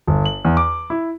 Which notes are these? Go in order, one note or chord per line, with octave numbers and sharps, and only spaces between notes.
G1
F#7
E2
D6
E4